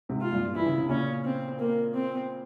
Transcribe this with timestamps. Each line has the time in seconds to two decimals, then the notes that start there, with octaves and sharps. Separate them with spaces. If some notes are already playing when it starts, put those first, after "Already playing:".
0.09 G#2 C3
0.21 F4
0.33 G2 A#2
0.55 E3 E4
0.66 C#3
0.78 C3
0.89 A#2 C#3 C#4
1.24 C4
1.59 A#3
1.93 C4